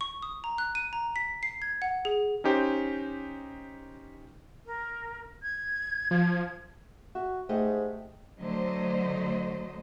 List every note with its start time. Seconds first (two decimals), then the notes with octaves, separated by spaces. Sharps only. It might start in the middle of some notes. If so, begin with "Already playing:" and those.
0.01 C#6
0.22 D#6
0.44 A#5
0.58 F#6
0.75 D#7
0.93 A#5
1.16 B6
1.43 C7
1.62 G#6
1.82 F#5
2.05 G#4
2.44 C#4 D#4 G4 C5
4.66 A#4
5.42 G#6
6.11 F3
7.15 F#4 E5
7.49 G#2 A3 G4 D#5
8.40 D3 F#3 A3 C5 D#5